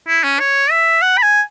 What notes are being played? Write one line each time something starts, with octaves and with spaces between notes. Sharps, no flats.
E4
C#4
C#5
E5
F#5
B5
G#5